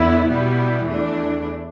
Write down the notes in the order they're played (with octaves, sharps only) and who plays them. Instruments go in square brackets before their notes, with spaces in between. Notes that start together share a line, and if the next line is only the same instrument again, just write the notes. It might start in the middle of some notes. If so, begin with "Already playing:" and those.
Already playing: [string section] E2 D3 B3 E4
B2 G3 B3 E4
E2 E3 A3 D4